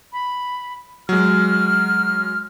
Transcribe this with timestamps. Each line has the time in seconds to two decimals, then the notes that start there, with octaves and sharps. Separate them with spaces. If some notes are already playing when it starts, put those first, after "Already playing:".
0.13 B5
1.09 F#3 G#3 F6